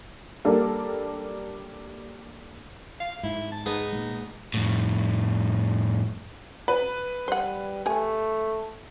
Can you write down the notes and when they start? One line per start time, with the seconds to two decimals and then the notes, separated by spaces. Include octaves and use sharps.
0.45 G3 A#3 D4 A4 A#4 D5
3.00 F5
3.23 G#2 E4
3.52 A5
3.66 B3 D#4 G#4
3.93 A#2 G#3
4.54 F2 A2
6.68 B4
7.28 G3 C5 F#5
7.86 A3 G4 G#5